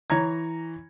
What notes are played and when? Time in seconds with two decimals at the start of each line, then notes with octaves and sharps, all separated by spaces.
0.10 E3 C#5 A#5 G#6